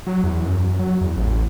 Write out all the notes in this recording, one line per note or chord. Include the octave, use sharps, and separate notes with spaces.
F#3
E2
F#2
F#3
E2
A1